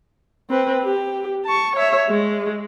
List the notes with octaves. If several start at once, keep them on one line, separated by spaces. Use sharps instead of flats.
C4 B4
G4
A5 C#6
C#5 E5
G#3